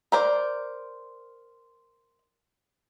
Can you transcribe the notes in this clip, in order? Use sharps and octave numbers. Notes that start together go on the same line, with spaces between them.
A#4 C5 D5